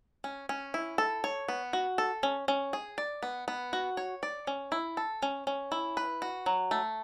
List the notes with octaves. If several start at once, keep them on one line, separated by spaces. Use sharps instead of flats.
C#4
C#4
E4
A4
C#5
B3
F#4
A4
C#4
C#4
G#4
D5
B3
B3
F#4
C#5
D5
C#4
E4
A4
C#4
C#4
E4
B4
F#4
F#3
A3